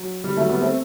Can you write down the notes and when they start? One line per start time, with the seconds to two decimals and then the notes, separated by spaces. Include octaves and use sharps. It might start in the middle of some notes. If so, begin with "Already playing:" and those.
Already playing: F#3
0.24 G3
0.36 F#3 A3
0.49 G3 B3
0.61 A3 C4